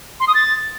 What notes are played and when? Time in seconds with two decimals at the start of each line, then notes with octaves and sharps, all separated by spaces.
0.20 C6
0.27 D#6
0.35 A6